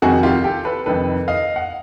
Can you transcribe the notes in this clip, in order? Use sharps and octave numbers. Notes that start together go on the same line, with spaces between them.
F2 C3 D#3 F#4 G#4
F4 G4
G4 A4
A4 B4
F2 C3 D#3 A4 B4
D#5 F5
F#5